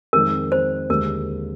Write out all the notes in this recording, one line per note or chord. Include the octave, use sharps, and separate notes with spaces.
F2 D#3 G#3 C4 A#4
C5
D#2 D3 G#3 A#4